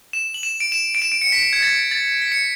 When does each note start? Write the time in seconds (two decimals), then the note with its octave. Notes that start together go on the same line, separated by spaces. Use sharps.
0.13 E7
0.34 F#7
0.43 E7
0.60 D7
0.72 E7
0.95 D7
1.02 E7
1.12 D7
1.22 C#7
1.32 B6
1.53 G#6
1.62 A6
1.91 A6
2.22 B6
2.32 C#7